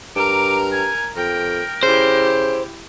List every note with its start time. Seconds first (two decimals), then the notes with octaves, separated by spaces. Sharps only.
0.16 G2 A#4 A#5 D6
0.72 G#5
1.16 F2 A#4 G5
1.83 C#3 E4 G4 C5